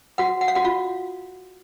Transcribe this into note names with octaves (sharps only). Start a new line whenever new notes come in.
F#4 F#5
F#5
F5
F#4 F#5
F4 F5